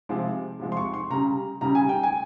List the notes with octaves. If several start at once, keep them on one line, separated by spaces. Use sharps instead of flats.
C3 F3 G#3
C3 F3 G#3
C6
C#6
C6
C#3 G3 A#5
C#3 G3 A#5
G#5
G5
G#5